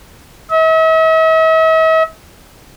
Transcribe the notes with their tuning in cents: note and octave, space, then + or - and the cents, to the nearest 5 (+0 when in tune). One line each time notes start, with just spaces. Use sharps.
E5 -45